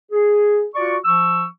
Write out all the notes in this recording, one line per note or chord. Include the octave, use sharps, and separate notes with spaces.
G#4
F4 F#4 D5 C#6
F3 C#6 E6